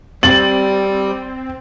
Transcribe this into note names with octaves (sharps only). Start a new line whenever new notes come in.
G3 C4 A6 F#7